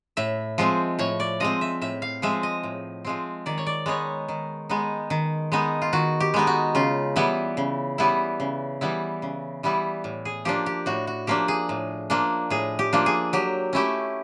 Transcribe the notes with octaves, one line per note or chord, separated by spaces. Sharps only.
A2 E5
F3 G#3 C4
A2 C#5
D5
F3 G#3 C4 D#5
E5
A2 E5
F5
F3 G#3 C4 E5
D#5
A2
F3 G#3 C4
D#3 D5
C#5
D5
G#3 B3 D#4 C#5
D#3
G#3 B3 D#4
D#3
G#3 B3 D#4
F4
D#3 F#4
G4
G#3 B3 D#4
F#4
C#3 F4
E3 G3 B3 E4
C#3
E3 G3 B3 E4
C#3
E3 G3 B3 E4
C#3
E3 G3 B3 E4
A2
G#4
F3 A#3 D4 G4
G4
A2 F#4
F#4
F3 A#3 D4 G4
G#4
A2
F3 A#3 D4
A2 G#4
G4
F3 A#3 D4
G#4
F#3 G4
A3 C#4 E4 G4